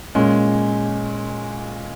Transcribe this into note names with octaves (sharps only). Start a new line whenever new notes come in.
A#2 G#3 C#4